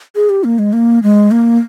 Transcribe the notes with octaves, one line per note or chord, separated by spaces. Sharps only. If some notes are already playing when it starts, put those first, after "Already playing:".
G#4
G4
A#3
G#3
A#3
G#3
A#3